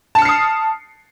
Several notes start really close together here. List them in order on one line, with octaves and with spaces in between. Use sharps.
A5 C#7 F6 C7 D#6